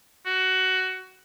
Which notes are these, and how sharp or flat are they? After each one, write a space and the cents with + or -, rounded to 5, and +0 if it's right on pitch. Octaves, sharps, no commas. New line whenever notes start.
F#4 +15